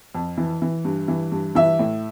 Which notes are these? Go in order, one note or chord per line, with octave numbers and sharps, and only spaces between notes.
F2
E3
E3
G2
E3
G2
E3 E5
A2